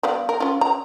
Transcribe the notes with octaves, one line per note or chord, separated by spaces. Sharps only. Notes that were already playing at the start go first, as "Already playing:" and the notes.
G3 B3 F5
A#4
C#4 F4
A#5